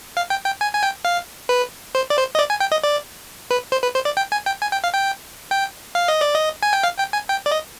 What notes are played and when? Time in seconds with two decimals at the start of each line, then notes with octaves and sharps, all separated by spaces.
0.17 F5
0.30 G5
0.46 G5
0.61 G#5
0.74 G#5
0.83 G5
1.05 F5
1.49 B4
1.95 C5
2.10 D5
2.17 C5
2.35 D#5
2.39 D5
2.50 G#5
2.60 G5
2.72 D#5
2.84 D5
3.51 B4
3.72 C5
3.83 B4
3.95 C5
4.05 D5
4.17 G5
4.32 G#5
4.46 G5
4.62 G#5
4.72 G5
4.84 F5
4.94 G5
5.51 G5
5.95 F5
6.08 D#5
6.21 D5
6.34 D#5
6.63 G#5
6.73 G5
6.83 F5
6.98 G5
7.13 G#5
7.29 G5
7.46 D5
7.51 D#5